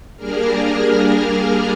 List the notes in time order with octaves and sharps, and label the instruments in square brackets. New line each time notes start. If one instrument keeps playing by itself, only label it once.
[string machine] G3 A#3 D4 G#4 A#4 F6